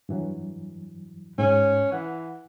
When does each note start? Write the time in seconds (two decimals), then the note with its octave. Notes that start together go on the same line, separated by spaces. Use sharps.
0.09 G2 E3 F#3
1.39 G#2 C#4
1.92 E3 F#5